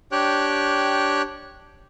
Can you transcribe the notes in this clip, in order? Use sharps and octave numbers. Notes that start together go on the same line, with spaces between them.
D4 G4 C#5 G5 F#6